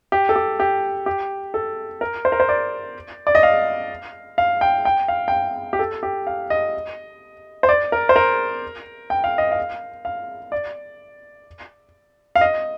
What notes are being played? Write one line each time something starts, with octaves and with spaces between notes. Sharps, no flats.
G4
A4
G4
G4
G4
A4
A#4
C5
A#4
C5
D5
D5
D#5
F5
F5
G5
G5
F5
G5
F5
G4
A4
G4
F5
D#5
C5
D5
A#4
C5
A#4
G5
F5
D#5
F5
F5
D5
F5
D#5